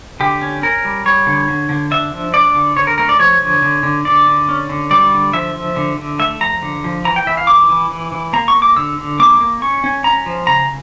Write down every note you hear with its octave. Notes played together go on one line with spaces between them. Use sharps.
D3 G4
C#4
C#4 A#4
G3
G3 C#5
D3
D3
D3
D4 E5
F3
D4 D5
D3
D3 C#5
A#4
A3 A#4
D5
F3 C#5
D3
D3
D3
D3 D5
D3
C#4
D3
G3 D5
D3
F3 E5
F3
D3
D3
A3 E5
F3 A#5
D3
F3
E3 A#5
G5
E3 E5
F5
E3 D6
E3
E3
E3
A#3 A#5
C#6
A#3
D6
D3 E6
D3
A#3 D6
A#3
C#4 C#6
C#4
C#4 A#5
F3
C#3 A#5